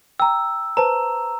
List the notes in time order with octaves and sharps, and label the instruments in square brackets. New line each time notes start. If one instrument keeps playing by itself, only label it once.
[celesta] G5 A#5 [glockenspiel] E6
[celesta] B4 C5 A5 [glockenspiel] A#5